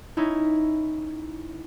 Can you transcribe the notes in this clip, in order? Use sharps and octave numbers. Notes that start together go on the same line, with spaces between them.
C#4 D#4 E4